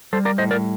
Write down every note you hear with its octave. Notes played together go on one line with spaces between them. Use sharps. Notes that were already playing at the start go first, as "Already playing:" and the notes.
G3 A4 C5
A#4 D5
A2 C5 D#5
A#4 D5